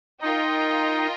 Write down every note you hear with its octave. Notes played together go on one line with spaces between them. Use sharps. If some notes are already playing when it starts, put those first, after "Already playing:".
D#4 F4 A#4 D#5 G5